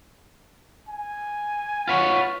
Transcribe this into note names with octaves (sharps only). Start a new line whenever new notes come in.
G#5
F4 B4 C#5 F#5